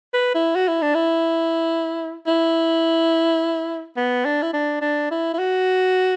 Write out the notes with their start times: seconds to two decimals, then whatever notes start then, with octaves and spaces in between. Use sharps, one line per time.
0.14 B4
0.35 E4
0.56 F#4
0.68 E4
0.82 D4
0.95 E4
2.27 E4
3.97 B3
4.25 D4
4.42 E4
4.54 D4
4.82 D4
5.11 E4
5.34 E4
5.39 F#4